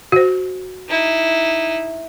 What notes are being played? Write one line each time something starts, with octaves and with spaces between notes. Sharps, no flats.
F#4 C5
D#4 E4